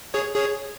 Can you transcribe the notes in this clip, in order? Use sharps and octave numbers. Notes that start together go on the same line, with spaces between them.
G#4 C#5
G#4 C#5